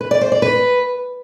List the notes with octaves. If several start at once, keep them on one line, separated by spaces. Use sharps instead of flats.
B4
D5
C5
D5
B4